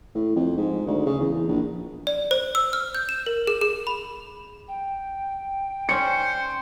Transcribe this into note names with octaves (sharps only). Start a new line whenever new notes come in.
A2
F2
G#2
D2
C#3
E2
A#1
D5
C5
E6
F6
G6
E7
A#4
G#4
G#4
B5
G5
C#4 C5 D5 C#7